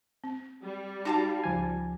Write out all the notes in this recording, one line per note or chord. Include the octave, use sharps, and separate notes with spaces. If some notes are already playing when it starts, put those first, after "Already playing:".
C4
G3
D#4 F#4 F5 G5 A5 A#5
C#2 F3 G#5